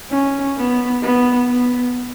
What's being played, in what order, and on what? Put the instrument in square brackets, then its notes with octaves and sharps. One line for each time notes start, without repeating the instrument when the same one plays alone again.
[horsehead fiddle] C#4
B3
B3
B3